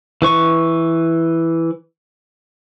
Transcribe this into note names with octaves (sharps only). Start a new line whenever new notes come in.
E3 B4 C#6